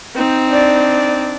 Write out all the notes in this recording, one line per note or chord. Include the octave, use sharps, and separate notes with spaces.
C4 D#4
D4 D5